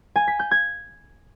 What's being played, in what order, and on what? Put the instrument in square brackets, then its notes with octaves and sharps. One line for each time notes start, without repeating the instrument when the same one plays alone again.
[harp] G#5
B6
G6
G#6